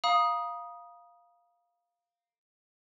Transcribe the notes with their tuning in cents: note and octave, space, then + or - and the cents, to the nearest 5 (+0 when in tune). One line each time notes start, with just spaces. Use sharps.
F5 +0 A#5 +40 D#6 +0